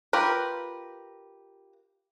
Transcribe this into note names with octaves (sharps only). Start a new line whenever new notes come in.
F4 G4 A#4 B4